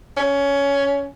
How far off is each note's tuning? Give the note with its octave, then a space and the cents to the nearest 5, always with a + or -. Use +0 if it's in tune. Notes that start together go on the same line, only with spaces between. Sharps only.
C#4 +15